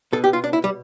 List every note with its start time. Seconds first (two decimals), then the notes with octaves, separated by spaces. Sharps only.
0.13 B2 A4
0.24 G4
0.33 F4
0.44 D4
0.53 E4
0.64 G3